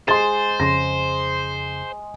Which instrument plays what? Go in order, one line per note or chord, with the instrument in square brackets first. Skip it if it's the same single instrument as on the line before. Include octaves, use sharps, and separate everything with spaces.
[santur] G#3 [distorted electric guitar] C5 [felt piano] C6 A6
[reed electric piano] F2 C#3 [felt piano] C6 A#6